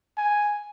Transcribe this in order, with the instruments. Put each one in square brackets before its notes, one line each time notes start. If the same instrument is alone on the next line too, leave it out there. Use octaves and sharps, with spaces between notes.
[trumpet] G#5